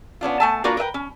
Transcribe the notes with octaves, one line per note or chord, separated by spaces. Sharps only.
B3 C#4 D4 F4
A3 G#5 A5
A#3 D4 F4 F#4 A#4 B4
A#4 B4 E5 G5
C#4